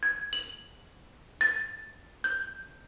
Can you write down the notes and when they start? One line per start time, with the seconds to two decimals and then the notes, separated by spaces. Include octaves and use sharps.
0.03 G#6
0.33 F#7
1.41 A6
2.24 G6